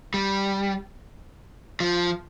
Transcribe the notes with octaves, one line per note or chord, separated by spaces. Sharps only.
G3
F3